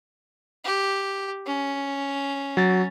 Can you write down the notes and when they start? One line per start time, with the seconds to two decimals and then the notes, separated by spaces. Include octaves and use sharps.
0.64 G4
1.46 C#4
2.57 F#3 A6